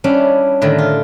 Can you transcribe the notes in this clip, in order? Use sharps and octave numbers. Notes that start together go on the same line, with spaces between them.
G3 C#4 D4 E4
A2 D3 D#3 A3
F4